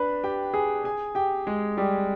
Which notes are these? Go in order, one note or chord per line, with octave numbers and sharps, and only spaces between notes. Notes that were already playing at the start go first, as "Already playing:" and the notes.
Already playing: D4 B4 B5
G4 G5
G#4 G#5
G#4 G#5
G4 G5
G#3 G#4
G3 G4